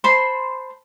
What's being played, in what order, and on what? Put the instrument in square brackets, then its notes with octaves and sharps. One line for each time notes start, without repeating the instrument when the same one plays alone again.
[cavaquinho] C5 A5 B5 C6